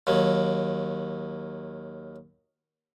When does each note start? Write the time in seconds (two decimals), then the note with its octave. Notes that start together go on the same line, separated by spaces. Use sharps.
0.07 D#2 D#3 F#3